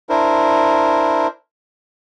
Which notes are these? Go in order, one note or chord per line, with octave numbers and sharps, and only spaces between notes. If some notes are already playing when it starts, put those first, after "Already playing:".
D4 E4 A#4 C5